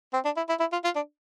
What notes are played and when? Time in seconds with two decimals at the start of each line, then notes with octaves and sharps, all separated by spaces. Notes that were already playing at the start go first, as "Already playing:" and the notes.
0.14 C4
0.25 D4
0.37 E4
0.49 E4
0.60 E4
0.73 F4
0.84 F4
0.96 D4